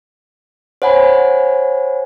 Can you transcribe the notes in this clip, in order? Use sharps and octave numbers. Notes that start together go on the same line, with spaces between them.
C5 C#5 F#5 G#5 B5